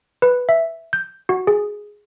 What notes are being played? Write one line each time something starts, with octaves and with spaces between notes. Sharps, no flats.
B4
E5
G6
F#4
G#4